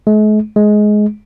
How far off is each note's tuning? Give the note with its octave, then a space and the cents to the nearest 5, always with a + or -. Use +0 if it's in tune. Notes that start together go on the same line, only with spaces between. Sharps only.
G#3 +45
G#3 +15